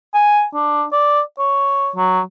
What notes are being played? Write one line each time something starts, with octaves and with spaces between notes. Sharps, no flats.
G#5
D4
D5
C#5
F#3